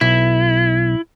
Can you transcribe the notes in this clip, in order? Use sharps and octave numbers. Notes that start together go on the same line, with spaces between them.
B1 E4